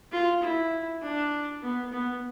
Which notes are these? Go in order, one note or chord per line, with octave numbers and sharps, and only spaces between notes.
F4
E4
D4
B3
B3